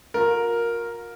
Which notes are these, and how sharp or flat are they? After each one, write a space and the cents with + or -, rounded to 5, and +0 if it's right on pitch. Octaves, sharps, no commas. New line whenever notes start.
F4 +45 A#4 +0